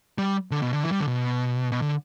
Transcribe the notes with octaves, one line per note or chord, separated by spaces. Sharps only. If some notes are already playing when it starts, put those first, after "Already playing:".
G3
D3
B2
D3
E3
G3
D3
B2
B2
D3